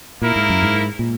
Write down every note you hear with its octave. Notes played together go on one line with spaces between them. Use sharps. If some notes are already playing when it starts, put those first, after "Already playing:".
A#2 A#3 E4 A#4
G#2
F#2
G#2
A#2